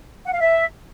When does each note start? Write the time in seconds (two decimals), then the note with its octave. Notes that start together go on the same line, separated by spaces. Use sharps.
0.25 F#5
0.33 F5
0.41 E5